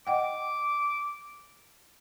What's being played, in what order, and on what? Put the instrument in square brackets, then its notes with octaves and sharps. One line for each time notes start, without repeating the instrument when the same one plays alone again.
[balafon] D#5 F#5 G5 [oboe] D6